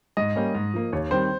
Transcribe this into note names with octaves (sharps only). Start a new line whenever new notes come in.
G#2 D#5
G3 A#3 C#4
G#2
F3 A#3
D#2 C#5
D#3 G3 C4 G4 C5